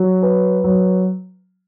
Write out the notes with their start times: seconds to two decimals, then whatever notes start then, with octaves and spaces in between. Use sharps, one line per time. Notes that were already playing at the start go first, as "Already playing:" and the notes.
Already playing: F#3
0.23 B4
0.64 F#3